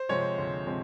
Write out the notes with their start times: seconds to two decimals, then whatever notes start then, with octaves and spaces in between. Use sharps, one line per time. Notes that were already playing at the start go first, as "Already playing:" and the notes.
Already playing: C5
0.09 C3 F3 G#3 C4 C#5
0.38 D2
0.67 C3 F3 G#3 C4